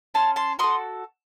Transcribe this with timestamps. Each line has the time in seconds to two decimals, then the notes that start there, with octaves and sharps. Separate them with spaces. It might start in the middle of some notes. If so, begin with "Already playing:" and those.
0.14 C#4 A5 C6
0.36 A5 C6
0.59 F#4 A4 C6 D#6